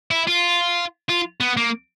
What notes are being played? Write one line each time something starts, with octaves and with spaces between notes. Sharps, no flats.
E4
F4
F4
B3
A#3